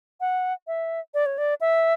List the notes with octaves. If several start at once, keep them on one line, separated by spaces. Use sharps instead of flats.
F#5
E5
D5
C#5
D5
E5